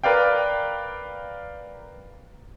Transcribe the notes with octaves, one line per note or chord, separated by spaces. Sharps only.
A#4 B4 D5 F5 G5